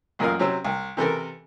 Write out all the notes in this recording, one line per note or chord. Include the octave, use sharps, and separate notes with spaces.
A1 F#2 A#2 A#4 D#5 F5
C3 F#3 C4 C#4 E6
C2
C3 E3 A4 A#4